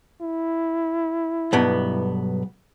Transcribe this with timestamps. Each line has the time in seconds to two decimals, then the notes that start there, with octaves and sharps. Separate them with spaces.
0.22 E4
1.53 B1 G2 B3